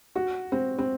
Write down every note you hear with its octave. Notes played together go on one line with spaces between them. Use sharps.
F#4
C4
C4